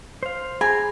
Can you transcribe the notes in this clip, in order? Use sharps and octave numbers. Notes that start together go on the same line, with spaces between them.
C5 F5
G#4 G#5 A#5 B5